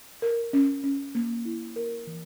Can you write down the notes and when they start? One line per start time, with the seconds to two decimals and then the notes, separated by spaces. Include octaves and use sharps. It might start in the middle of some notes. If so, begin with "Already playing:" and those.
0.22 A#4
0.53 C#4
0.84 C#4
1.15 A#3
1.45 E4
1.76 A#4
2.07 E3